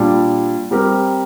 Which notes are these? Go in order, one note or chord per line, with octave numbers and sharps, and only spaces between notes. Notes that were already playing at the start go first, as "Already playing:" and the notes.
Already playing: A#2 G3 D4
G3 C4 G4 A#4